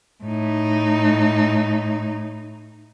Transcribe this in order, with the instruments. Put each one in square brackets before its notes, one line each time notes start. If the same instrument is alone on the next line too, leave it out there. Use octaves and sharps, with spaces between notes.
[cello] A2 D#4